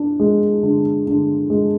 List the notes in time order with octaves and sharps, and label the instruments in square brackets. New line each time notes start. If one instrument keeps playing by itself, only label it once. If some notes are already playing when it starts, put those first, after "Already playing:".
Already playing: [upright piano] D4
G#3
D3
D3
G#3